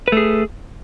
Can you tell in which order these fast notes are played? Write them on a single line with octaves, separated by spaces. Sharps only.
B4 A3 G#4